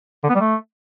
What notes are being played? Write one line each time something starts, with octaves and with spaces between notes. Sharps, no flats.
D3
B3
G3
A3